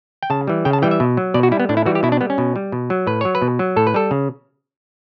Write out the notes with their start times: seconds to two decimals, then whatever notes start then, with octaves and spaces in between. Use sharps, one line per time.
0.23 G5
0.30 C#3 A5
0.47 E3 G3
0.65 C#3 G5
0.73 A5
0.82 E3 G3 G5
0.91 E5
1.00 B2
1.17 F#3
1.34 B2 D5
1.43 F#4
1.51 G3 E4
1.60 B3
1.69 A2 D4
1.77 E4
1.86 E3 G3 F#4
1.95 G4
2.03 B2 E4
2.12 D4
2.21 G3 B3
2.30 C#4
2.38 B2
2.56 G3
2.72 B2
2.90 F#3
3.07 A2 B4
3.21 F#3 C#5
3.35 B4
3.42 B2
3.59 F#3
3.76 A2 A4
3.87 B4
3.94 G3 A4
4.11 C#3